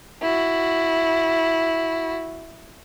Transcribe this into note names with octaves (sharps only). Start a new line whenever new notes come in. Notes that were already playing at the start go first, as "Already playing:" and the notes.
E4 F#4